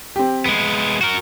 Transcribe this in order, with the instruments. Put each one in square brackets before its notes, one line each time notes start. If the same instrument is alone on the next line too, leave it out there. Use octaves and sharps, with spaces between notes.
[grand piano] C4 G4
[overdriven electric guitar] G#3 B3 [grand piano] D7
[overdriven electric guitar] F#4 A#4